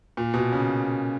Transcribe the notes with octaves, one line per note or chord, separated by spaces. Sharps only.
A#2
B2
C#3